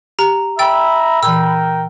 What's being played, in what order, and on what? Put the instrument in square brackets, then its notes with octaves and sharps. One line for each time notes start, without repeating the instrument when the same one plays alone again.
[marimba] G4 [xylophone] A#5
[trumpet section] E5 A#5 [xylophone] G5 E6 [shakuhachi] B5 [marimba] A6
[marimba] A#2 E3 [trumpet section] A#4 G5 [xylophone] E6